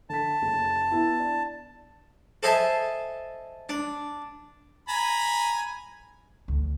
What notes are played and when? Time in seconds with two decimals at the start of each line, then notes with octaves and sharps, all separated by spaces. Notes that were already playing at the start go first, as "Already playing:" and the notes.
0.09 D3 A5 B6
0.42 F#1
0.91 B3 E4
1.20 D4
2.43 A4 C5 D#5 E5 G#5 A5
3.69 D4
4.88 G#5 A#5 B5
6.48 D2